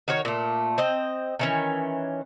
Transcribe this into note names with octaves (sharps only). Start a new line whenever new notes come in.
D#3 F#4 A#4 C#5
A#2 A3
C4 D#5
D#3 E3 C#4